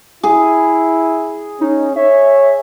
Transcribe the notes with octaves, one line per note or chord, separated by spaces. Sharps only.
E4 G#4
C#4 D#4
C#5 E5